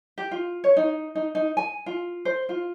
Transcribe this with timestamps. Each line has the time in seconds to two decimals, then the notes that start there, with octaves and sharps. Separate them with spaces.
0.18 G4
0.31 F4
0.64 C#5
0.77 D#4
1.15 D#4
1.35 D#4
1.57 G#5
1.86 F4
2.25 C5
2.49 F4